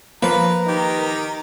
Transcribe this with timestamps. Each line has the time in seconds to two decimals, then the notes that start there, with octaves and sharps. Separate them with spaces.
0.22 F3 A#3 A#4 B4
0.67 D#3 D#4 G4